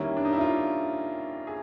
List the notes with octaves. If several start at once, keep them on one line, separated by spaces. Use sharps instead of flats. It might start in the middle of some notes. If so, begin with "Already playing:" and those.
Already playing: D#2 D#3 G3 A#3 C#4 E4
D4
D#4
E4
F4
G#4